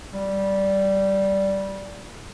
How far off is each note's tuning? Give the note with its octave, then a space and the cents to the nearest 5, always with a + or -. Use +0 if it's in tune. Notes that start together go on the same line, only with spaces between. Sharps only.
G3 -10